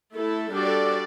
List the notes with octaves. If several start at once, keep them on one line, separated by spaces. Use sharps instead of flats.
A3 E4 A4
G3 D4 F#4 A4 D5